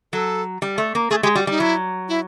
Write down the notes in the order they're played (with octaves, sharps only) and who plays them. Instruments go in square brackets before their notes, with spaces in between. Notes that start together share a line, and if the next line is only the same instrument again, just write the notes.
[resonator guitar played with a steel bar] F#3 [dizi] A4
[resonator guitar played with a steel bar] G3
A3
A#3
[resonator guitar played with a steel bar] A3 [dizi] G#4
[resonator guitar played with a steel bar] G#3 [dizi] G4
[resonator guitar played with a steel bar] G3 [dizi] F#4
[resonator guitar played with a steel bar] G3 [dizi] D#4
[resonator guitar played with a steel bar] F#3 [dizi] E4
[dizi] E4